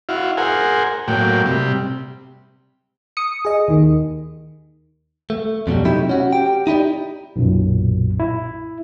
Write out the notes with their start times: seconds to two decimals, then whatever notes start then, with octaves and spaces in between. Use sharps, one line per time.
0.09 E4 F#4 F5
0.37 G#4 A#4 C5 F#5 G#5
1.08 A2 F#3 A#3 G5
1.46 C3 G3
3.17 D#6 C#7
3.45 G#4 D#5
3.68 D#2 D#3
5.30 A3
5.67 F2 B2 F#3 G3
5.85 C3 F#3 A3 D#4 E4 G4
6.09 C#4 F#4
6.33 G4 G5
6.67 D#4 E4 G4 D5
7.36 B1 F#2 A#2
8.20 E4